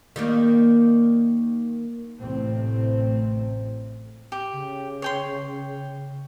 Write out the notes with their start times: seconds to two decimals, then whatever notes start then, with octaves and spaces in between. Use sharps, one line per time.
0.16 D#3 G3 A#3
2.19 A1 A2 C3 A3 C4
4.32 G4
4.53 C#3
5.02 C#5 G5 C6